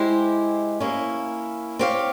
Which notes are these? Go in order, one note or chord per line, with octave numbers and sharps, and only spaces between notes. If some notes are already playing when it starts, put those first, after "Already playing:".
Already playing: G#3 E4 G4 C5
A#3 C#4 E4
C4 G4 C#5 F5